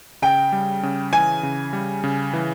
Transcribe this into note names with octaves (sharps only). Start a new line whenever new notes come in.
C#3 G5
G3
C#3
E3 G#5
C#3
G3
C#3
E3